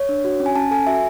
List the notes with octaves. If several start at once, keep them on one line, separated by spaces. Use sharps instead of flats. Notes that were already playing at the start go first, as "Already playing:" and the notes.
Already playing: C#5
D4
F#4
C#4
G#5
C#4 A5
A4 G#5
F#4 E5